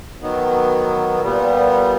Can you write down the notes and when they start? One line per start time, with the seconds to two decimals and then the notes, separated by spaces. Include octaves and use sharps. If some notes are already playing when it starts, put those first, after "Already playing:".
0.21 D#3 F#3 B3
1.21 A#2 G3 B3